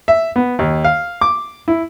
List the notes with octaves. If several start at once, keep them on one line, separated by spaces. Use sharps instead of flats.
E5
B3
D#2
F5
D6
E4